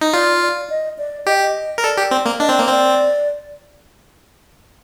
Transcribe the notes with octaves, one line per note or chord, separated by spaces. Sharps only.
D#4
F4 D5
D5
D#5
D5
G4 D#5
D#5
A#4
A4 D5
G4
C4
A#3
D4 D#5
C4 D5
A#3 C5
C4 D5